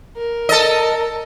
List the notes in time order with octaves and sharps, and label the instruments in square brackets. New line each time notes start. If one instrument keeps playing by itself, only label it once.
[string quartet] A#4
[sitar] A4 D#5